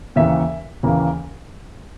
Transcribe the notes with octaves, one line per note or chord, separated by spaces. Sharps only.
D#2 C#3 E3 A#3 E5
D#2 C#3 E3 A#3